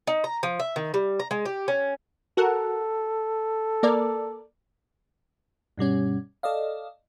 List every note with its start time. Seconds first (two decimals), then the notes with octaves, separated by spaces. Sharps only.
0.07 D#4
0.24 A#5
0.43 F3
0.60 E5
0.76 D#3
0.94 G3
1.20 A#5
1.31 G#3
1.45 G4
1.68 C#4
2.37 F#4 A4 A#4 F#5
3.83 A#3 A#4 D5
5.78 G2 B2 G3 C#4
6.43 A4 D5 D#5 F5